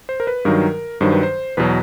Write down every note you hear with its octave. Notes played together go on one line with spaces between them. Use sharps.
C5
A#4
B4
G2 D#3 F#3 A#4
G2 D#3 F#3 C5
B4
C5
E2 B2 F#3 B4